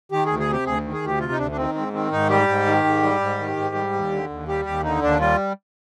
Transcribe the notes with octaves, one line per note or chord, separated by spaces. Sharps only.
D#3 G4
D2 G#4
G#4
C3 G4
D2 G#4
D#3
G#4
D2 G4
C3 F4
D#4
D2 D4
D4
D#3 C4
G#2 C4
D#3 C4
G#2 D#4
G3 G4
G#2
D#3
G#2
G3
G#2
D#3
G#2
G3
D#2
D3
D#2
G3 G4
D#2 G4
D3 D#4
D#2 D4
G3 F4